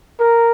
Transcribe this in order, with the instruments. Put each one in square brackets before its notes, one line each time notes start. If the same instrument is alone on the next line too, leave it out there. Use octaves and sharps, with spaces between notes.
[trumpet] A#4